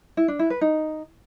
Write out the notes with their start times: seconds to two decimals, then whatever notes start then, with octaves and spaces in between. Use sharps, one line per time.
0.17 E4
0.28 D4
0.39 E4
0.50 B4
0.61 D#4